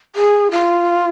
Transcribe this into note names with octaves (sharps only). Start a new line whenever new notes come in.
G#4
F4